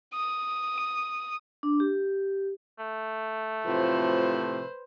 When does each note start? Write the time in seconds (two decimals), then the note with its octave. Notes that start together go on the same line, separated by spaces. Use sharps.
0.14 D#6
1.63 D4
1.80 G4
2.79 A3
3.66 A2 C3 F3 F#3 C4 F4 B4 C5